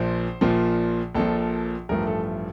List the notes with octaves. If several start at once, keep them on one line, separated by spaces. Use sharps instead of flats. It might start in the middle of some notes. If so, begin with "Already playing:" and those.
Already playing: A#1 A#2 F3 C5
A#1 A#2 F3
A#1 A#2 F3 A4
A1 G2 F3 A3 A#4
A4